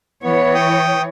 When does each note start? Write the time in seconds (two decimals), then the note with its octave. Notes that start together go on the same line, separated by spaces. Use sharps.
0.24 E3 B3 C#5
0.54 G5 D#6